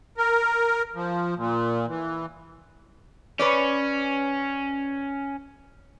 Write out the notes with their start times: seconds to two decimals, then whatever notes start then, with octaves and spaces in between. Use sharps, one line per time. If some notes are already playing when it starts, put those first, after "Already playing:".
0.17 A#4
0.95 F3
1.37 A#2
1.88 E3
3.39 C#4 B4 C#5 D5